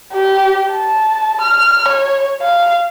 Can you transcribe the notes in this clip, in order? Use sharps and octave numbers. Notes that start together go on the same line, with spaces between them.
G4
A5
F6
C#5
F5